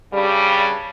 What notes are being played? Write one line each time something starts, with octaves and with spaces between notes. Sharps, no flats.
G2 C#3 G3